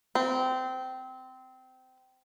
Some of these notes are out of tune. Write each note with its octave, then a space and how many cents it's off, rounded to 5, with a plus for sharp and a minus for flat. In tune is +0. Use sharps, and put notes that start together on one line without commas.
C4 -20